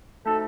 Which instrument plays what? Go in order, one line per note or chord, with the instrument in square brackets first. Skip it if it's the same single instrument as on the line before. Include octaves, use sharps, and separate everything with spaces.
[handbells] A3 D#4 F#4 C5 [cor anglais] A4